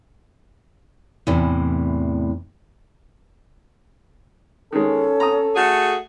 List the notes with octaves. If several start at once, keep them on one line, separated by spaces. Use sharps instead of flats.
E2 A2 C3 E3
D#3 G#3 C#4 A4
A#5 D#6
A3 F#4 G#4